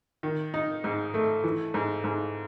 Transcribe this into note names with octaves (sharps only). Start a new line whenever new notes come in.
D#3
D#4
G#2
A3
E3
G#2
G#2